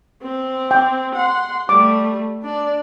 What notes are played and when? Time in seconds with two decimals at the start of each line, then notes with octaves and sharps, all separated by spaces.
0.22 C4
0.71 G5
1.15 F#5 C6
1.69 G3 A3 D6
2.43 D4 D5